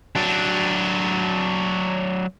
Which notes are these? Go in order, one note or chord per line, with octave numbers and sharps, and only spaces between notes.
F#3 D4